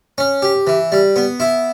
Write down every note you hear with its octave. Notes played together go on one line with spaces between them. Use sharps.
C#4
G4
E3
G3
B3
E4